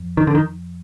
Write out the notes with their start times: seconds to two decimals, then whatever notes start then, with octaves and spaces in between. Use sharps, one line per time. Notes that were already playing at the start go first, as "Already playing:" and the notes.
Already playing: F2
0.17 D#3
0.27 D3
0.35 D#3